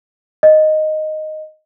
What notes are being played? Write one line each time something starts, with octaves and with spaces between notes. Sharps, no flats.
D#5